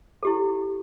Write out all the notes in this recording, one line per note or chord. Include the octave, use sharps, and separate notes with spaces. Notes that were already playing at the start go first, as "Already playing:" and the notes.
E4 G4 A4